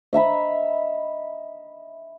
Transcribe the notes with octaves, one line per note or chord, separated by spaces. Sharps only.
D#5 E5 A#5 B5